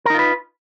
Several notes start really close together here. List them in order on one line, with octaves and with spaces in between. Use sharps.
A#4 D#4 F4 B4